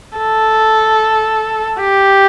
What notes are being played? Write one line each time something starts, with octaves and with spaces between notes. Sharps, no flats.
A4
G4